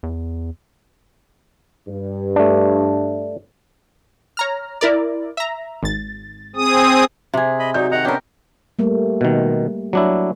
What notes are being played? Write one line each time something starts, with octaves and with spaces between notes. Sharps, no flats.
E2
G2
A3 D4
C#5 A#5 F6
E4 A#4 D5
E5 A#5
G#1 A6
C4 G#4 D#6
C3 G#4
D#5 B5
F#3 D#4 F#4 D5 G6
D#3 D#5 F#5 A#5
B3 C#4 D4 G4 A#4
G3 A3 A#3
B2 D#3
F#3 D4 E4